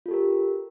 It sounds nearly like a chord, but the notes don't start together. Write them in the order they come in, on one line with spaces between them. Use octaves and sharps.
F4 A4 G4 A#4